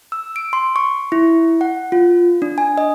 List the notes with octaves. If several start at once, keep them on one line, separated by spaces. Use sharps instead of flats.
E6
D7
C6
C#6
E4
F#5
F4
D4
G#5
D#5